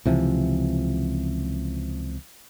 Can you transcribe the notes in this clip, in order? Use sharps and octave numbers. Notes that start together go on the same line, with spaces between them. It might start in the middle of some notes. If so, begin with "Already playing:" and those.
C#2 C3 E3 F3